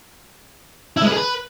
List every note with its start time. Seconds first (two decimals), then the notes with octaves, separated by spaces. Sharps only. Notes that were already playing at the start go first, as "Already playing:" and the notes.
0.97 E4
1.02 G#3
1.07 B4
1.12 G#4
1.17 B4